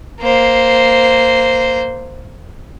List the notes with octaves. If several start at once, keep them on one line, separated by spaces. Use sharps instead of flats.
A#3 C5